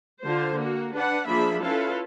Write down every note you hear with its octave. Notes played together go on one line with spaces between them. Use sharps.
D3 F4 C5
A#3 F#4
D4 B4 F#5
F3 A#3 D4 G#4 E5 B5
C#4 E4 F4 A4 B4 F5